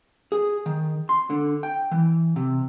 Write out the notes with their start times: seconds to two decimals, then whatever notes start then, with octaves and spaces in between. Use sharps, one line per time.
0.32 G#4
0.66 D#3
1.09 C6
1.30 D3
1.63 G5
1.91 E3
2.36 C3